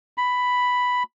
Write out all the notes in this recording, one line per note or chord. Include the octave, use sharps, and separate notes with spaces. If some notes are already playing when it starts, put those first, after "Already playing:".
B5